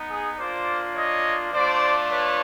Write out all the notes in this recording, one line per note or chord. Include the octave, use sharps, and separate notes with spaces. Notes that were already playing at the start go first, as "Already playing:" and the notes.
Already playing: B3 D#4
G#4
A#3 D4 F4 C5 D5
C#5 D#5
A3 D4 F4 C5 D5
B4 C#5